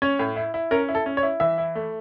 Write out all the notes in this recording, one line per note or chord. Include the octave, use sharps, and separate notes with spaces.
C#4 C#5
A2
E4
E4
C#4 A#4
E4
A4
C#4
C#5
E4
E3 E5
E4
A3